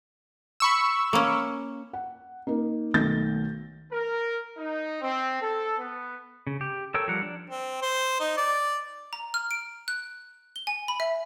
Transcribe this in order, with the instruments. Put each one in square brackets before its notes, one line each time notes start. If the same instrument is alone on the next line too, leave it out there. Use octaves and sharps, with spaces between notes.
[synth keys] B5 C#6 E6
[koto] A#3 C#4
[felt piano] F#5
A#3 D#4
B1 D#3 A3 G6 A6 A#6
[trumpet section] A#4
D#4
C4
A4
B3
[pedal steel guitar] C#3
G4
A4 A#4 C#5 G5 E6
F3 G3 A#4 F#5
D4
[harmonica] C4
C5
D#4
D5
[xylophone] A#5
F6
D7
F#6
G7
G#5
B5
E5